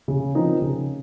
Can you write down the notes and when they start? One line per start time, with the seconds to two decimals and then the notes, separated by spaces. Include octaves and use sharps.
0.08 C#3
0.35 F3 C4 D#4 A#4
0.62 C#3